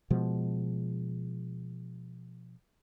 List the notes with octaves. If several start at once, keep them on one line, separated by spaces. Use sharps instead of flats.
B2 F3 G#3